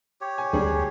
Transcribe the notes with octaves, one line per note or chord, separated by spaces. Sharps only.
G4 C#5
G#5
D2 G3 D4 G#4